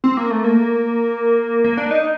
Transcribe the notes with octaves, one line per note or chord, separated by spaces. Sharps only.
C4
A#3
A3
A#3
A#3
D4
D#4